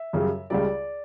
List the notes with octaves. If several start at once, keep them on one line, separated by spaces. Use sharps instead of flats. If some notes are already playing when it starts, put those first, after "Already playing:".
Already playing: E5
F#2 C#3 G3
C#2 C#3 G3 D5